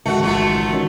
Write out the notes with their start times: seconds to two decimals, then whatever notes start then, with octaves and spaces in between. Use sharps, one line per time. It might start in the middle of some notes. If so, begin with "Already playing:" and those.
0.06 C#2 G#2 D#3 A3 F#4 C#7
0.23 A1 F#3 A3 F4
0.71 C#2 D#3 C#4